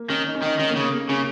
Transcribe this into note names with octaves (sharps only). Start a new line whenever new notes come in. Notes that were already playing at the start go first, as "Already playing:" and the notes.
Already playing: A#3
D#3 C#4
D#4
C#4
D#3 D#4
D#3 C#4
A#3
C#3
A#3
A#3
C#3 C#4